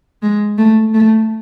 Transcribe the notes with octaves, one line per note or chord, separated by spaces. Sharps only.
G#3
A3
A3